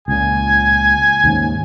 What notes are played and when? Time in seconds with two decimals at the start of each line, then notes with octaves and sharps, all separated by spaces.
0.08 C#2 A#2 G#5
1.24 D#2 G#2 C#3